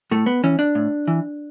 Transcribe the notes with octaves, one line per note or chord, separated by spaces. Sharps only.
A2 A3
B3
E3 C#4
D4
A2
E3